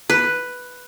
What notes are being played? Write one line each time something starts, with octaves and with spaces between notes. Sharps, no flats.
B4